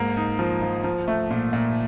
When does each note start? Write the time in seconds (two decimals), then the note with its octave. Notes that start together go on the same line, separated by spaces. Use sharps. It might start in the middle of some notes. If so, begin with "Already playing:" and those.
Already playing: G#2 A#3
0.17 D#4
0.39 F3
0.62 F3
0.84 F3
1.08 A3
1.31 A#2
1.53 A#2